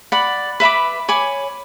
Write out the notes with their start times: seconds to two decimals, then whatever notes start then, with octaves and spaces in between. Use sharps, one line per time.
0.12 D5 F#5 B5
0.60 B4 E5 B5 D6
1.09 C#5 G#5 B5 D6